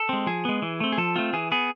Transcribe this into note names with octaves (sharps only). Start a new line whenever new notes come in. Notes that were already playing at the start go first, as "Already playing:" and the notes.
Already playing: A4
G#3 C4
F3 G#4
G#3 B3
E3
A3 C4
G#4
F3 A4
A3 C4 F4
E3 G#4
B3 G#4